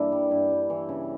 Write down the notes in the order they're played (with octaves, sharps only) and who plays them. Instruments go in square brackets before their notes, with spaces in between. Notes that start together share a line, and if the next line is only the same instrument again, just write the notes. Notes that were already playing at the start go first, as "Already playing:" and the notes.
Already playing: [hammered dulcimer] G2 E3 A#3 D4 E4
G3
G2 E4
G2
E3
C#3